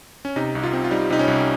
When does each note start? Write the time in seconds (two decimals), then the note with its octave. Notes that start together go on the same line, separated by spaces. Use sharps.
0.25 C#4
0.36 C3 D#4
0.55 C2
0.63 F4
0.73 C4
0.84 F4
0.91 G3 D#4
1.10 C3 D#4
1.19 C#4
1.28 C2